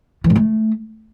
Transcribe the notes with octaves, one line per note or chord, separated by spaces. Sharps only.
E3
G#2
A3